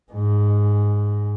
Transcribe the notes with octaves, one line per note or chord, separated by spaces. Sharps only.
G#2